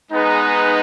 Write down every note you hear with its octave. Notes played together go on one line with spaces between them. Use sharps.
G#3 B3 D#4 G#4 B4